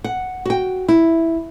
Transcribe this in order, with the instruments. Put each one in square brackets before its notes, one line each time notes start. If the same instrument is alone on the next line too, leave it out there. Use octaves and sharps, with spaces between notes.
[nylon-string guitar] F#5
F#4 G5
E4